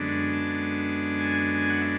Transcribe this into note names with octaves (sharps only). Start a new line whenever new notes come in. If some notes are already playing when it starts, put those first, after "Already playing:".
Already playing: F#2 D3 G#3 B3 D4
A5
A5
G#5
G#5
F#5
E5